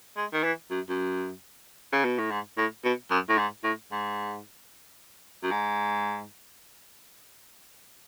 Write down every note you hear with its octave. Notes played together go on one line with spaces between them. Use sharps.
G#3
D#3
E3
F#2
F#2
C#3
B2
A2
G#2
A2
B2
F#2
A2
G#2
A2
G#2
F#2
G#2